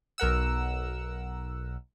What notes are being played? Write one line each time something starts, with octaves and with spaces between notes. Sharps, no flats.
B1 A#4 F#5 E6